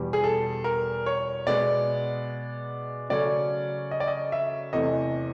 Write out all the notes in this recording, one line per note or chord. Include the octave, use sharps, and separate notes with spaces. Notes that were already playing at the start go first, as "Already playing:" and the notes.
Already playing: E2 B2 G3
G#4
A4
A#4
C#5
B2 G#3 B3 D5
C#3 F#3 A3 C#4 D5
D#5
D5
D#5
E5
E2 C3 E3 A3 D#5